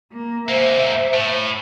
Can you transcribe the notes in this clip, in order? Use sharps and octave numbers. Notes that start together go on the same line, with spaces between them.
A#3
G#2 A#3 C5 E5
A2